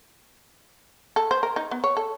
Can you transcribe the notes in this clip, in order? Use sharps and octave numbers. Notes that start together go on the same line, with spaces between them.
A4
C5
A#4
D#4
B3
C#5
A4